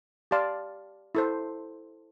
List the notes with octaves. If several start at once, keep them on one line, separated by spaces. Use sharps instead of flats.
G4 D5 F5 A5 C6
E4 A4 C5